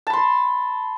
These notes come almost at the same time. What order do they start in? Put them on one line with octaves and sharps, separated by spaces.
A5 B5 C6